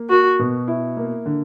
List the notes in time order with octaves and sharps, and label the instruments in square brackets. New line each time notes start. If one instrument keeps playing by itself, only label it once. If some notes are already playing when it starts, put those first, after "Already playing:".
Already playing: [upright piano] A#3
[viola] F#4 [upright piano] A#4
[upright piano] B2
E4
A#3
D3